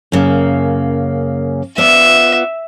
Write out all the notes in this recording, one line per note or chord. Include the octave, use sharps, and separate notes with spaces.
F#2 C#3 A#3
B3 F4 D5 E5